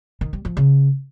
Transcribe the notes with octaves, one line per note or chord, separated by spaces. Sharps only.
D#3
G3
F3
C#3